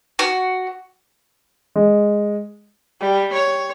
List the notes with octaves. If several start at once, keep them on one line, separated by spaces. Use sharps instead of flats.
F#4
G#3
G3
C#5